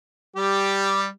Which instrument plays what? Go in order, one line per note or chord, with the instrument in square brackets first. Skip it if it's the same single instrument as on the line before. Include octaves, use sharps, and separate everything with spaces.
[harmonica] G3 G4